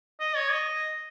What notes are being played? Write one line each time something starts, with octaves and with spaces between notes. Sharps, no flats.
D#5
C#5
D#5